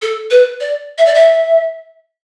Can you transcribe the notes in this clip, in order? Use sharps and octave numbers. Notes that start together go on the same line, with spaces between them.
A4
B4
D5
E5
D5
E5